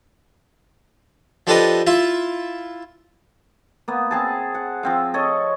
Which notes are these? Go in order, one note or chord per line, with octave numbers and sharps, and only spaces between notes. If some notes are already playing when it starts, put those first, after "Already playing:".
F3 D4 G4 A4 B4 D#5
E4 F4 E5
A#3 B3
C4 G#4 A5
F#5
F3 C4 F5
A4 C#5 D#5